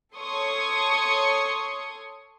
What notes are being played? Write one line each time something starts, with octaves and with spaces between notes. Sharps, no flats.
A4 C#5 C6 C#6 D#6